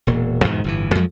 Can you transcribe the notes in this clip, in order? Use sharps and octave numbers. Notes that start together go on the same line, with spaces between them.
E1 A#2
E2 G#2 B2 D#3
G1 A2 E3
F2 F3 F#3 G#3